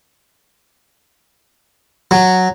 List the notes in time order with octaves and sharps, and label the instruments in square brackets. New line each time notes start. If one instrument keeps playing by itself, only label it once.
[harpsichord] F#3